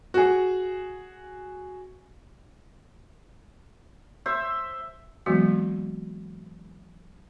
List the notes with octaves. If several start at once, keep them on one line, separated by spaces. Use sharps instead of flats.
F#4 G#4
C5 E5
E3 F#3 G#3 A#3 B3 F#4